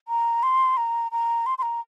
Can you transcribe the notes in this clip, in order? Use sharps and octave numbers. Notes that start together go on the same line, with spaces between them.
A#5
C6
A#5
A#5
C6
C6
A#5